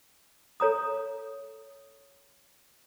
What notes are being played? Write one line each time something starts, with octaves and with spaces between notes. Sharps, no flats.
A4 C#5 A#5 D#6